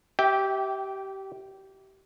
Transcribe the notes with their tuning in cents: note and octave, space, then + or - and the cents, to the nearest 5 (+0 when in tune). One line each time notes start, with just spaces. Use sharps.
G4 -25 E5 -20 G5 +0